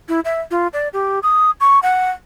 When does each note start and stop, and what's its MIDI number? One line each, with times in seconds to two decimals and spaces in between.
0.09 0.20 64
0.25 0.41 76
0.51 0.68 65
0.73 0.89 74
0.93 1.19 67
1.23 1.51 87
1.60 1.80 85
1.83 2.10 78